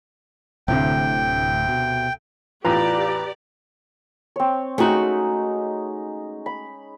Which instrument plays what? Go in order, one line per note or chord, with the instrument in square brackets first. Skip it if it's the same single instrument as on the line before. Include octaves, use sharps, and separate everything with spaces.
[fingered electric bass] D1 A2 [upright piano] D2 C3 [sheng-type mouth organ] G5
[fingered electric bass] B2
[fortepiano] E2 A2 [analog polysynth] F4 [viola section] G4 D5 [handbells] B4 A#5
[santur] C4 C#5
[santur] G#3 C#4 D#4 [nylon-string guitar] A3 F#4
[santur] B5